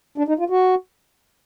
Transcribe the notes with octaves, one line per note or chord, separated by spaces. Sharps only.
D4
D#4
F4
F#4